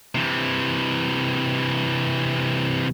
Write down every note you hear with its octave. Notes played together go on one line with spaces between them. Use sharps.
C3 E3